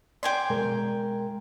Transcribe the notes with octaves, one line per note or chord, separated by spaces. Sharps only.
D5 G5 G#5 C6
B2 G#3 A#4